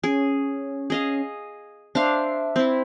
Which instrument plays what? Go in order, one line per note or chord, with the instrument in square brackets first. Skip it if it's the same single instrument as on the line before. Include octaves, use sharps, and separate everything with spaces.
[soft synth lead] C#4 [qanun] G#4
[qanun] G#4 D#5 F5
[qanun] D4 C5 F5 [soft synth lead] E5
[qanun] C4 E4